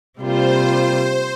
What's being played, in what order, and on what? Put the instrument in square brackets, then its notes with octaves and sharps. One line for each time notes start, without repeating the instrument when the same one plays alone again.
[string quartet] C3 G3 A#3 F4 [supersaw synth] C5